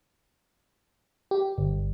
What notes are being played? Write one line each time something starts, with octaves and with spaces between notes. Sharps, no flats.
G4
G1